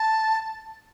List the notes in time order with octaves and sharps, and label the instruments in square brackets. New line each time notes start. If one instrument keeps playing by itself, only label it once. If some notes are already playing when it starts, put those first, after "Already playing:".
Already playing: [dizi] A5